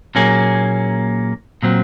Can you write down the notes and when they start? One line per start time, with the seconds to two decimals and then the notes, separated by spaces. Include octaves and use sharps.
0.15 A#2 F#3 A#3 C#4 G#4
1.63 A#2 F#3 C4